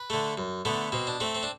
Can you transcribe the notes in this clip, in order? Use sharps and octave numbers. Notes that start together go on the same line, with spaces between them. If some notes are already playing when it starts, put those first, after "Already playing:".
Already playing: B4
D3 A3
F#2
D3 A3 B3
B2 C4
D4
A3 C4
C4
D4